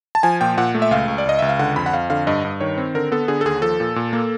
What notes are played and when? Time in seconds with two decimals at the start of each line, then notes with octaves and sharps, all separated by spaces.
0.15 A5
0.23 F3 G#5
0.41 A#2 G5
0.58 A#2 F#5
0.75 A3
0.82 E5
0.91 C#2 F5
1.08 C#2
1.18 D5
1.25 C#2 D#5
1.39 C#2 E5
1.49 F5
1.59 D3 F#5
1.76 F2 B5
1.86 F#5
1.93 F2 F5
2.10 D3 F5
2.27 G2 D#5
2.45 G2
2.60 D#3 C#5
2.78 C4
2.95 D3 A#4
3.12 B3 A4
3.28 D3 G#4
3.41 A4
3.45 D#2 G#4
3.62 F3 A4
3.80 A#2
3.96 A#2
4.13 A#3